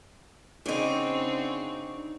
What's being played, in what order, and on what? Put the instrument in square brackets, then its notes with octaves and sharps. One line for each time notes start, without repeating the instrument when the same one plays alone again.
[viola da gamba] C#3 C4 F#4 [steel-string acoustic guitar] D4 D#4